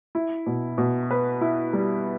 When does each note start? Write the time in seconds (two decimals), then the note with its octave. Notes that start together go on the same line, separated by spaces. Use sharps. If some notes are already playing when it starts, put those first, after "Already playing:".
0.15 E4
0.46 B2
0.78 B2
1.11 B4
1.41 E4
1.73 G3